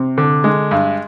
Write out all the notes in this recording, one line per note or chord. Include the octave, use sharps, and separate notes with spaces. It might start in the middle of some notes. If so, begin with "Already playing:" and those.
Already playing: C3
D3
G#3
G2